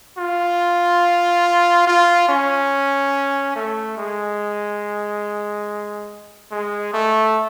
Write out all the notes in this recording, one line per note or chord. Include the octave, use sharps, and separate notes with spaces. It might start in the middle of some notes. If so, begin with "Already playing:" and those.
F4
F4
C#4
A3
G#3
G#3
A3